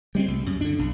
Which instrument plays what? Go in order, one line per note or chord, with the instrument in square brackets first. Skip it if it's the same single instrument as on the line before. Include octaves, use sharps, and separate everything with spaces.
[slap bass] G3 G#3 B3 C4
C2
F#2
D3 D4
B1